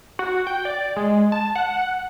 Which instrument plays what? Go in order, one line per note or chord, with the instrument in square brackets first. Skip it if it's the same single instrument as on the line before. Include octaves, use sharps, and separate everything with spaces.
[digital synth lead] F#4
G5
D5
G#3
A5
F#5